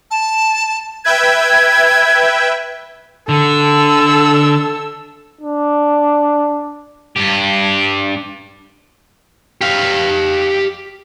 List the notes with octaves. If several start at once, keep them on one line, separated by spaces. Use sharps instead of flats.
A5
B4 E5 G5 G#6
D3 A4 E6
D4
G2 G4
G4 F5